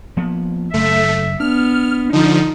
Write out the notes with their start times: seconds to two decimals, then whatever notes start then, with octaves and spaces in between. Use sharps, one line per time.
0.17 F3 A#3 B3
0.74 F#1 A3 E5
1.40 B3 D4 F6
2.13 D3 F3 D#4